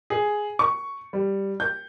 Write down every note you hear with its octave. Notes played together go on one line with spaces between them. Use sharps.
G#4
C#6
G3
G6